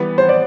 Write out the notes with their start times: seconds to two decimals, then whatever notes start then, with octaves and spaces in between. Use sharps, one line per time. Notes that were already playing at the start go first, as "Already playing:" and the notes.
Already playing: E3 G3 B3 B4
0.18 C5
0.29 D5